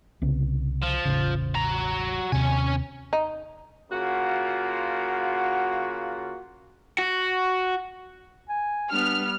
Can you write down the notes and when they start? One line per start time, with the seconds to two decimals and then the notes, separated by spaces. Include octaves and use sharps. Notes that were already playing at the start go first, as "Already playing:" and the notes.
0.22 C2 C#3 B3
0.83 F3
1.05 E1 A1 C#3
1.55 F#4 A#5
2.32 D#2 C3 C#4 G#5
3.13 D#4
3.91 C#3 A#3 F4 F#4
6.98 F#4
8.49 G#5
8.92 G3 B3 D4 F6